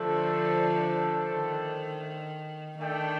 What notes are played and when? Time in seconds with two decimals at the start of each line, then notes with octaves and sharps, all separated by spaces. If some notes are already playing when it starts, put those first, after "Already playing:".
Already playing: D3 F3 A3 D4 A4 C5
1.31 D#3
2.79 D#3 A3 D4 A4 D5 G5